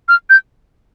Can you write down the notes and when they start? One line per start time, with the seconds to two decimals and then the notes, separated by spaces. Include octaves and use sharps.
0.08 F6
0.30 G6